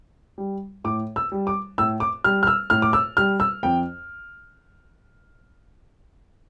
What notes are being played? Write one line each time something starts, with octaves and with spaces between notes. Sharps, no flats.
G3
A2 D6
E6
G3
D6
A2 E6
D6
G3 F6
F6
E6
A2 F6
D6
E6
G3 F6
E6
F2 G5